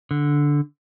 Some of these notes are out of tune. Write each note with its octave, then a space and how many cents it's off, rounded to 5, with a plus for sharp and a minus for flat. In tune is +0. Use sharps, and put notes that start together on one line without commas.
D3 -5